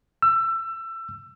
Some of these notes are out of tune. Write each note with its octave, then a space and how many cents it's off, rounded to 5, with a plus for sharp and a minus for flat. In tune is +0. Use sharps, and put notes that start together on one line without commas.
E6 +25